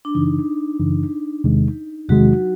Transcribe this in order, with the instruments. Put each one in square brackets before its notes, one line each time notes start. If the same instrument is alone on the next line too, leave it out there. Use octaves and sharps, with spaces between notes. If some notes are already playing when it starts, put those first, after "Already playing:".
[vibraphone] D4
[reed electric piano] F#2 C#3 E3 [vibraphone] D#4
[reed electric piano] F#2 C#3 E3
E2 C3 D#3 G#3
[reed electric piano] E2 C3 D#3 G#3 [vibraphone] F#3 F#4